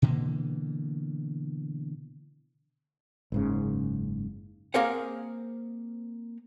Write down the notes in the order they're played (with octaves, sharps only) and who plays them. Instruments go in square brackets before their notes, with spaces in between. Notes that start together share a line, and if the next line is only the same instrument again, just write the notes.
[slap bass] B2 D3 E3 A#3
[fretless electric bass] F#1 G#2 C#3
[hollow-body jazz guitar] A#3 C4 G#4 A#4 C5 F#5